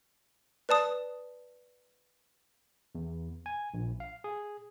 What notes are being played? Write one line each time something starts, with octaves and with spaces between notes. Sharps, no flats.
B4 D5 A5 D#6
E2
G#5
A#1
F5
G#4